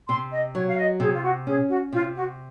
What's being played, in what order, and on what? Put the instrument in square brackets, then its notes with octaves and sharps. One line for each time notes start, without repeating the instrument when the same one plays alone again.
[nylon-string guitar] C3 [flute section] C6
[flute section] D#5
[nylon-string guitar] F#3 [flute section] C#5
[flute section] F5
D#5
[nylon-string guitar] C3 [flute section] G#4
[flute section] F4
F#4
[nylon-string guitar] C#4 [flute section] G#4
[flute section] F#4
[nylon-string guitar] C3 [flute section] F4
[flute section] F#4